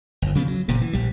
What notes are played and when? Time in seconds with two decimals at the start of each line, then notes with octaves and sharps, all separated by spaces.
0.22 G1 E2
0.35 C#3 F3 A#3 B3
0.48 F#3
0.68 F#1 A#2 C#3
0.81 E3
0.93 A#1 G3